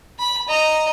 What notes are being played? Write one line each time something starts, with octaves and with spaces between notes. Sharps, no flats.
B5
D#5 A#5